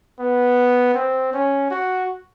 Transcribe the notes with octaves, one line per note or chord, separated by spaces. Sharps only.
B3
C4
C#4
F#4